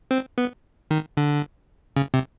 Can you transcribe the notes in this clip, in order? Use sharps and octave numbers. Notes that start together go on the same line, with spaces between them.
C4
B3
D#3
D3
C#3
C3